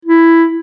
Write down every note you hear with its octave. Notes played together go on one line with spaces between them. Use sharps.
E4